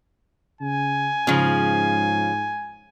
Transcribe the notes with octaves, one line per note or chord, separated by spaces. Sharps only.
C#3 G#5
G#2 C#3 F3